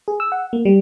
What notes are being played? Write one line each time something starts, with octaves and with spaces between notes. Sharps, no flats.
G#4
E6
F#5
A#3
G3